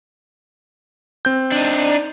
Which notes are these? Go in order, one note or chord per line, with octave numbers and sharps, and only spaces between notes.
C4 G6
D4 D#4